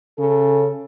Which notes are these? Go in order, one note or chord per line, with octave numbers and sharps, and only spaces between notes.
C#3 A4